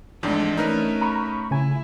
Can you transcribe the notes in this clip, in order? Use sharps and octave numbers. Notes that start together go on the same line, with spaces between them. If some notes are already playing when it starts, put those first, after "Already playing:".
F2 G#2 E3 G#3 A3 D4 A4
A3 C#4 D#4 A#4 B4
A#5 B5 C#6
C#3 E4 G#5